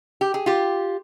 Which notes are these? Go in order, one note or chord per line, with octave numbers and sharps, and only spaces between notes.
G4
G#4
F4 G4